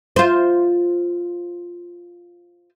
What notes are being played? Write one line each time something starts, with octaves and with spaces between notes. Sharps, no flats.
F4 C5